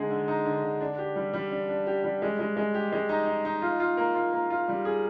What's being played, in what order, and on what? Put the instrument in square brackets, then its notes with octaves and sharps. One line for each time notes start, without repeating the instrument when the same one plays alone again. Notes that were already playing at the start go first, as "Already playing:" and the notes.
Already playing: [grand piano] D3 G#3 D#4 G#4
D3
D#4
D3
D3
D4
G4
G3
G3
D4
D4
G4
G3
G#3
G#3
G#3
G4
G#3
D#4
D#4
D#4
F4
F4
A#3
F4
A#3
F4
G3
G#4